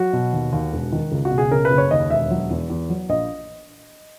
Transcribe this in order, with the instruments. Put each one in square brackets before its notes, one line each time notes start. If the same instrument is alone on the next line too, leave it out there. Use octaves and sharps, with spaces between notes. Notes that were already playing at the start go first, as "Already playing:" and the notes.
Already playing: [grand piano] F#3 F#4
B2
D#2
D#2
E1
D#3
C#2
F#4
B2
G#4
C#3 A#4
B4
F#1
C#5
D#2 D#5
E1 E5
F#3
E2
E2
F#3
A#1 D#5